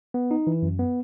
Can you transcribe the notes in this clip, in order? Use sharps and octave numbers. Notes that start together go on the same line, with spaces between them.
B3
D#4
E3
F#2
B3